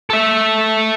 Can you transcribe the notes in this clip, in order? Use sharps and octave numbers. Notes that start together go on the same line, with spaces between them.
A4 E5